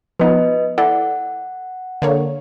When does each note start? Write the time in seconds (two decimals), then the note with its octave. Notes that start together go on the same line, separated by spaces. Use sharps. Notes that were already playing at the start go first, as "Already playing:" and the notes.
0.20 F3 B3 D#4 B4 D#5
0.78 E4 A4 D5 F#5
2.02 D3 A#3 C#5